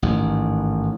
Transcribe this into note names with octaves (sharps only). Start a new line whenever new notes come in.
A1 G#2 D#3